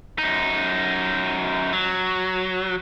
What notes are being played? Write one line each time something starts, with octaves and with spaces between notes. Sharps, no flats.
F#2 D#4
F#3